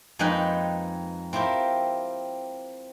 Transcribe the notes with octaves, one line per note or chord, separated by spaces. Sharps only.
F2 G#3 A#3 D#4 B4 G5
C4 E4 F4 G4 A#4